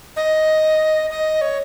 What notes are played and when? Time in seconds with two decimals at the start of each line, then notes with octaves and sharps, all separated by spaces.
0.16 D#5
1.10 D#5
1.41 C#5